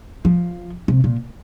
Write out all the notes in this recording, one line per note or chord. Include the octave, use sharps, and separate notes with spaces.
F3
C3
A#2